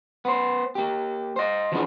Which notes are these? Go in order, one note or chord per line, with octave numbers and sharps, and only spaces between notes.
B3 C5
A#3 G4
C5 D#5
E3 F3 A3 B3 D4 G#4